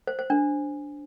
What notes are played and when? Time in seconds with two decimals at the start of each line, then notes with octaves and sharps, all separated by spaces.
0.07 C5
0.19 C5
0.30 D4